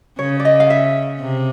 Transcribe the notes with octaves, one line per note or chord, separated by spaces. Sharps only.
C#3 C#5
D5
D#5
F5
E5
C3